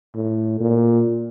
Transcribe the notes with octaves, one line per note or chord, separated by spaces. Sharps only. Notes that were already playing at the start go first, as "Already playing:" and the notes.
A2
A#2